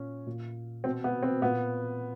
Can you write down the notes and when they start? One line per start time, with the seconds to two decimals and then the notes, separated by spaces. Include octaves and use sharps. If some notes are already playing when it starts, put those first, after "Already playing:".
Already playing: A#2 C#4
0.27 A#2
0.84 B2 C4
1.04 B3
1.23 C4
1.42 A#2 B3